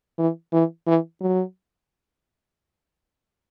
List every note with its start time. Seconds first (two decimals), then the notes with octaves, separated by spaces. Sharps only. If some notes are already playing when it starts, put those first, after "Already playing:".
0.18 E3
0.53 E3
0.87 E3
1.21 F#3